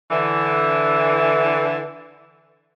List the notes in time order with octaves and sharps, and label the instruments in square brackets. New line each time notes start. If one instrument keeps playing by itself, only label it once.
[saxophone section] D3 E3